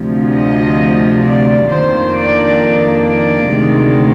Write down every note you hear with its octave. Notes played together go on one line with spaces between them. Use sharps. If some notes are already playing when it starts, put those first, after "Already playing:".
Already playing: D2 C3 F3
D#5
D5
F2 D#3 A#3 D4 C5
D5
D5
D2 C3 D#3 G#3